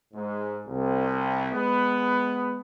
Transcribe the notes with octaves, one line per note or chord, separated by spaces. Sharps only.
G#2
C2
G#3 B3